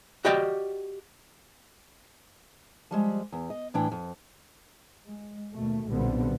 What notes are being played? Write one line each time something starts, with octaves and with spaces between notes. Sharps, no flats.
F#4 G4 D5 D#5 G5
F3 G3 G#3
E2
D#5
A2 E3 D4 G5
F2
G#3
D#2 B2 A3
B1 A#2 D3 G3 B3 C4